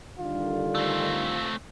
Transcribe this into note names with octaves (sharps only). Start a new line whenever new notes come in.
D3 D#3 G3 F4
A3 C4